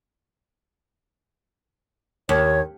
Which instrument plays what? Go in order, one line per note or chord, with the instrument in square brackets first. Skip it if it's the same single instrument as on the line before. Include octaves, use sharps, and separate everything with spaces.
[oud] D#2 [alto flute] C#5